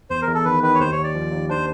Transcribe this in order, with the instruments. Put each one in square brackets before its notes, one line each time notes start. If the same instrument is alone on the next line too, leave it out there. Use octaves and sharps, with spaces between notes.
[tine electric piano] E2 [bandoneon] C5
[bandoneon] A#4
[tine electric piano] E2
[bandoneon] A4
[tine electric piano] D#3 [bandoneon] B4
[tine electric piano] D#3 [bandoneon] B4
[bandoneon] C#5
[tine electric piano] D#2 [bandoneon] C5
[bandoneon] C#5
[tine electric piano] D#2
[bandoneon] D5
[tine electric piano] F3
D#2
[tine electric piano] D4 [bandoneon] C5